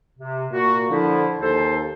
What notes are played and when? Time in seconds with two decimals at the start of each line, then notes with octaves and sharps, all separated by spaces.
0.17 C3
0.52 A#2 F#4
0.91 D3 F3 E4
1.41 D#2 A4 C5